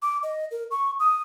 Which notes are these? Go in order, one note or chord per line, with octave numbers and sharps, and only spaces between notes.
D6
D#5
A#4
C#6
D#6